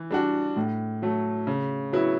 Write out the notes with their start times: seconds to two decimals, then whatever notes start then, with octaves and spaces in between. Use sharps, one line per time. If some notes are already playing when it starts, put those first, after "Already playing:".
Already playing: E3
0.11 G3 D4 F#4
0.56 A2
1.02 F#3 A3
1.47 C#3
1.93 F#3 B3 E4